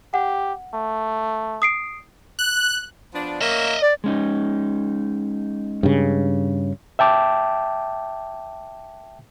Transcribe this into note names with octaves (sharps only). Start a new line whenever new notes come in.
G4 F#5
A3
D#6 C7 D7
F#6
F3 B3 D4
A#3 C#4 A#4 D#5 E5
D5
G#3 C#4 D#4
G2 C#3
E5 G5 A5 D6